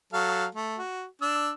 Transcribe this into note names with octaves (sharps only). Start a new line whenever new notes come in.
F#3 A4 F5
A3
F#4
D4 E6